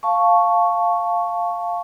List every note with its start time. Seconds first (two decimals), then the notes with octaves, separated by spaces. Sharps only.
0.03 F5 A5 C#6